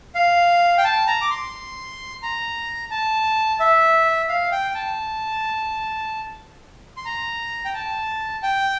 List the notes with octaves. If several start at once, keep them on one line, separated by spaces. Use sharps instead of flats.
F5
G5
A5
A#5
D6
C6
A#5
A5
E5
F5
G5
A5
C6
A#5
G5
A5
G5